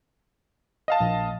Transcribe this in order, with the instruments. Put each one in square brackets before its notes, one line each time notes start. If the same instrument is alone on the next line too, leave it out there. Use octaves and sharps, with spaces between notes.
[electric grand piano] D#5 F5 A5
[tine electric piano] A#1